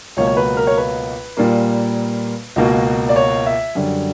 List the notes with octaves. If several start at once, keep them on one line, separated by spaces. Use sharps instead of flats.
C#2 B2 F#3 A#3 C#5
C#5
B4
A#4
C#5
B4
A#2 G3 A#3
C#2 B2 A#3
D5
C#5
E5
F#2 D3 G3